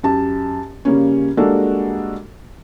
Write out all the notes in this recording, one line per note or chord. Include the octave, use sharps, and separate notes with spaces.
F#2 G4 A5
C#3 G3 A#3 C#4
G3 G#3 A#3 D4 F#4 A4